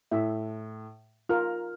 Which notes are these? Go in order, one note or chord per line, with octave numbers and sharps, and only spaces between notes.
A2 E5
F4 A#4 F6